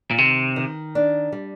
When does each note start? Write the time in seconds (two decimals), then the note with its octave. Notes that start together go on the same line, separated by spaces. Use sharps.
0.11 A#2
0.18 C3 D#3
0.56 D#3
0.95 D4
1.32 G3